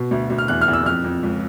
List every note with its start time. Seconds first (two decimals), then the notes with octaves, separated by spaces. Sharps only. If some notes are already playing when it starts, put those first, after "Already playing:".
Already playing: B2
0.11 D2
0.30 D2
0.38 F6
0.48 E2 F#6
0.61 F6
0.68 E2
0.73 E6
0.86 F2 F6
1.04 F2
1.23 C#2